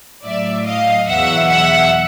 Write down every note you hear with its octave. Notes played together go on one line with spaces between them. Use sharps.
A2 F#3 D5 E5
D#5 F5
E2 B2 F#3 E5 F#5
E5 F#5